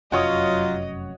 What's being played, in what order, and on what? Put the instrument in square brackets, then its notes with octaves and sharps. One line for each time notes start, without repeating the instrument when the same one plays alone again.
[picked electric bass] F1 F#2 [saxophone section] F#3 F4 [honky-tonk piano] F#4 C#5 D#6 [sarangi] D#5